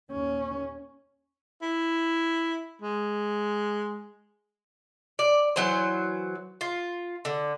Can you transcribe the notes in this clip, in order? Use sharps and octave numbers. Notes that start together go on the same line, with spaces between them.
D#2 C#4
E4
G#3
D5
E3 F#3 C5
F4
D3